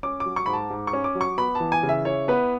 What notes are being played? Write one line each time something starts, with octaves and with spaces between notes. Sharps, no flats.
C#4 D6
D6
F#3
C#6
G#2 B5
A5
G#2
C#6
C#4
D6
F#3
C#6
B3 B5
A5
E3
G#5
C#3
E5
E4 C#5
B3 B4